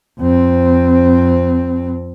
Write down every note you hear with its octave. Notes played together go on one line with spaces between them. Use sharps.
F2 C4